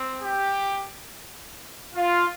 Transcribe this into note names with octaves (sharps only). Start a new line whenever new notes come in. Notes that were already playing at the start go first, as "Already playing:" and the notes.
Already playing: C4
G4
F4